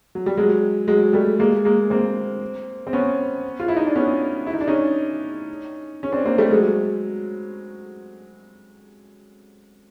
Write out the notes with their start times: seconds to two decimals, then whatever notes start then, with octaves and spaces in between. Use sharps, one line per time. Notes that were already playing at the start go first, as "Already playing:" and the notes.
0.15 F#3
0.26 G3
0.37 F#3 G#3
0.88 F#3 G#3
1.13 G3 A3
1.39 G#3 A#3
1.65 G#3 A#3
1.90 A#3 C4
2.87 C4
2.93 B3 C#4
3.60 F4
3.68 E4
3.76 D#4
3.87 D4
3.95 B3 C#4
4.46 E4
4.54 D#4
4.61 D4
4.68 C#4 D#4
6.03 C#4
6.12 C4 D4
6.25 A#3 C4
6.38 G3 A3
6.51 F#3 G#3